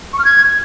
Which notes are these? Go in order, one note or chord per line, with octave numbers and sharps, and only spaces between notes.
C#6
F6
G#6